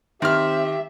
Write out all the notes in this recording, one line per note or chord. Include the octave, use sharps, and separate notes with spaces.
D#3 C4 G4 E5 F6